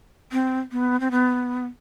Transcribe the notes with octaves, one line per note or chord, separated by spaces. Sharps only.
C4
B3
C4
B3